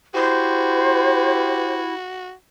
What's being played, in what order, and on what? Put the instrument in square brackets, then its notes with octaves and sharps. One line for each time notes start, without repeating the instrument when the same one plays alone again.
[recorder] E4 [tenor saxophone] F#4 [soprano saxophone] G4 [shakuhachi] C5